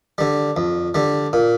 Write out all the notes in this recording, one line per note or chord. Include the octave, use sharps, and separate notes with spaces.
D3 G3
F2
D3 G3
A#2